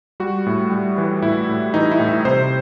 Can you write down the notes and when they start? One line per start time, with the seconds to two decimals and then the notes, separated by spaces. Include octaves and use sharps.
0.20 G3 F#4
0.46 A2
0.72 G3
0.98 E3
1.22 A2 E4
1.49 A2
1.74 E3 D#4
1.91 E4
2.00 A2
2.09 E4
2.25 C3 C5